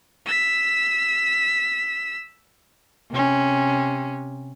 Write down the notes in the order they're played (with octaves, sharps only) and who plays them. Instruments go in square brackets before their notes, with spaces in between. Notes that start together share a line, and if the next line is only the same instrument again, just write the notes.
[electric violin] E6 B6
[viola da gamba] C3 C#4